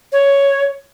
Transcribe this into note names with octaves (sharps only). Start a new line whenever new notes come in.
C#5